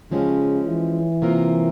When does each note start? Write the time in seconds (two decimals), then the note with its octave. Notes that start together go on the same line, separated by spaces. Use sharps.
0.11 C#3 F3 G#3 C#4 G4
0.67 E3
1.22 C3 G3 A#3 F4 A#4